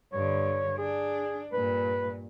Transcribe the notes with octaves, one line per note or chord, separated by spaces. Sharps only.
G2 D3 C#5
D4 G#4
G2 A#2 B4